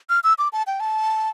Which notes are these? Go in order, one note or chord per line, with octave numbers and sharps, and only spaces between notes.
F6
E6
D6
A5
G5
A5